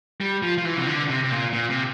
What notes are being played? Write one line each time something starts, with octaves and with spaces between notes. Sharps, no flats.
G3
F3
F3
E3
C3
D3
C3
C3
A#2
A#2
C3